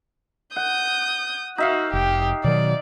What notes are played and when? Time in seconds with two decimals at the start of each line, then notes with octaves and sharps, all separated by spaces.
0.56 F#5 D#6 G6
1.58 D#4 F#4 E5 F5
1.93 F1 G4
2.44 B2 D#3 F#3 D5